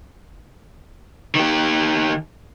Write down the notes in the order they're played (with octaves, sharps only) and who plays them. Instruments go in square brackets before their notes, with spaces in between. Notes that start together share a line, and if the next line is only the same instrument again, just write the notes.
[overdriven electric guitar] D#3 G4